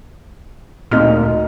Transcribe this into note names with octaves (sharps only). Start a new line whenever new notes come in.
D2 A#2 D#4 F6